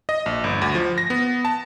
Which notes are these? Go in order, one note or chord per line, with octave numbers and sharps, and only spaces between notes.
D#5
A#1
G1
D2
F3
A#6
B3
A5